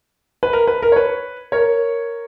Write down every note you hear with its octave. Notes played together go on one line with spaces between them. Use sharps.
B4
A#4
B4
A#4
C#5
B4
A#4 C#5